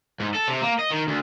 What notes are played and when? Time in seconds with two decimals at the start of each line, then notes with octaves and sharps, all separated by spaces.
0.20 G#2
0.35 A4
0.48 C3
0.62 A#3
0.79 D#5
0.91 D#3
1.08 D2